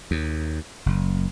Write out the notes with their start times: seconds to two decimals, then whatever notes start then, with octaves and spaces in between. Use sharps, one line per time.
0.11 D#2
0.86 F#1